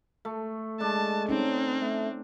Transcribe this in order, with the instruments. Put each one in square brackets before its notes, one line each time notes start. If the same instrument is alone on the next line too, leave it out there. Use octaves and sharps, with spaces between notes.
[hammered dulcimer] A3
[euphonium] G#3 [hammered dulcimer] D4 [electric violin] A5
[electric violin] C4 [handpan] C#4 D#4
[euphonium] A3